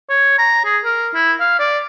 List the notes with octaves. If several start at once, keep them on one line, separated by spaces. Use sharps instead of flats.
C#5
A#5
G#4
A#4
E4
F5
D5